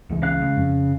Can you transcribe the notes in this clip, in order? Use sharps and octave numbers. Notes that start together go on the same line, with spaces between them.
C#2 E3 G#3
C#3 F5 F#6
G#3
F2